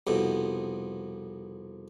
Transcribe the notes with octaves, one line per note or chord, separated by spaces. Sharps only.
C2 F2 B2